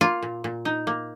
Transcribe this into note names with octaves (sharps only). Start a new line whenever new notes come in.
A#3 F4
A#2
A#2
D#4
A#3